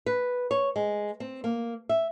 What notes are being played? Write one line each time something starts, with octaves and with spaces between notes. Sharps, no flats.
B4
C#5
G#3
C4
A#3
E5